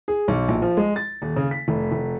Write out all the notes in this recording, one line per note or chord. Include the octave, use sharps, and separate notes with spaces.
G#4
B1
A#1
F3
G#3
A6
D#1
C#3
B6
F1
F1